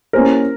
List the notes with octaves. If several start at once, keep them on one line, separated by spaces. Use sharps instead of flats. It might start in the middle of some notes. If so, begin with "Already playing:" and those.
A#3 C#4 E4 G4 A#4 C5